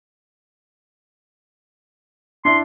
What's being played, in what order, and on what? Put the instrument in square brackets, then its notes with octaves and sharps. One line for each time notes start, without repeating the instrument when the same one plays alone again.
[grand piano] D4 E4 [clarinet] C6